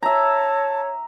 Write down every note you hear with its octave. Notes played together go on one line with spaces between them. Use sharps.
C#5 E5 A5 A#5